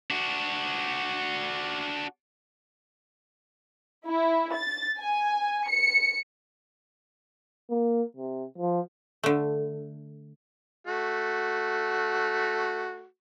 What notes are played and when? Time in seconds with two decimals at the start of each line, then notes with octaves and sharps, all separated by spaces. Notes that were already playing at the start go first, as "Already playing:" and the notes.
0.10 D4 F#4
4.06 E4
4.53 A6
5.01 G#5
5.68 C#7
7.70 A#3
8.16 C3
8.58 F3
9.23 D3 A3
10.86 A3 F#4